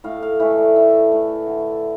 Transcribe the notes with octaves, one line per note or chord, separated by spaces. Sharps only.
A2 F5
F5
E3 A3 E5
D5
A2 E5
E3 A3
D3